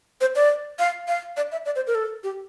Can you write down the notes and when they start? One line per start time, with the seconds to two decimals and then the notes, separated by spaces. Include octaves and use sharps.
0.21 C5
0.36 D5
0.79 F5
1.08 F5
1.37 D5
1.52 E5
1.66 D5
1.76 C5
1.87 A#4
1.95 A4
2.24 G4